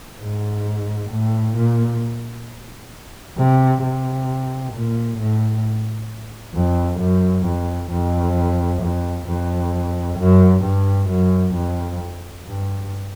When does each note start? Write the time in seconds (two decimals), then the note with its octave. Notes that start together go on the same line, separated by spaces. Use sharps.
0.19 G#2
1.10 A2
1.56 A#2
3.37 C3
3.83 C3
4.73 A#2
5.18 A2
6.55 F2
7.00 F#2
7.46 F2
7.91 F2
8.82 F2
9.27 F2
10.18 F#2
10.64 G2
11.09 F#2
11.54 F2
12.45 G2